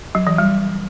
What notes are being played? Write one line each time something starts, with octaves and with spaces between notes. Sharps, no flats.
F#3
E3
G3